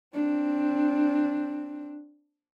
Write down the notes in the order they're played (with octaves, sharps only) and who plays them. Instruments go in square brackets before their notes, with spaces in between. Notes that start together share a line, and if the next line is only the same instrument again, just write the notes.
[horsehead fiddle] C4 D4